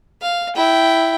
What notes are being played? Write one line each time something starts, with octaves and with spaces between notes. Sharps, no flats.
F5
E4 G5